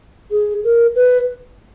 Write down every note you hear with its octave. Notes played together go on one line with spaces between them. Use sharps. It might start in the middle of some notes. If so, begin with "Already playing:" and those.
G#4
A#4
B4